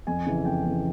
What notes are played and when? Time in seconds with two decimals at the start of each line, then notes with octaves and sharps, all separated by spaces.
0.07 F2 G#5
0.27 C#3 E3
0.45 F2 G5
0.64 C#3 E3